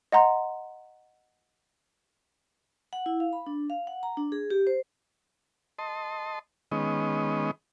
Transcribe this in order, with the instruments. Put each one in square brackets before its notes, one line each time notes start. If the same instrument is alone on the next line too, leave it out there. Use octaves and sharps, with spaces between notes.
[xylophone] D#5 F#5 A#5 C6
[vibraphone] F#5
E4
F5
B5
D4
F5
F#5
A#5
D4
G#4
G4
C5
[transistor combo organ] D#5 A5 C6
D#3 G#3 B3 C#4 D#5